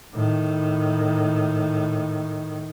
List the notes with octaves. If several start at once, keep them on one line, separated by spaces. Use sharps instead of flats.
A2 D#3